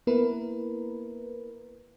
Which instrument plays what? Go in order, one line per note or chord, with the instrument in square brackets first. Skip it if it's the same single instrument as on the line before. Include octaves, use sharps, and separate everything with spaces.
[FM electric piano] A#3 B3 E4 A#4 B4